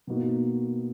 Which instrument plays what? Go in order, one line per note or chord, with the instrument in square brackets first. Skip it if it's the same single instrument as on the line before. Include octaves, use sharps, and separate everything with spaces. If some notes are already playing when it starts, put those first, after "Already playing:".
[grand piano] B2 A#3 D#4 F#4